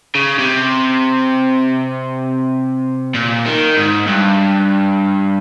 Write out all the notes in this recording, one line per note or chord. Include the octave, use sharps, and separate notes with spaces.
C#3
C3
A#2
D#3
G#2
G2